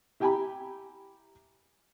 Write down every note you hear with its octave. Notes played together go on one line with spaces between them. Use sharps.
E4 G4 G5 G#5 A#5 B5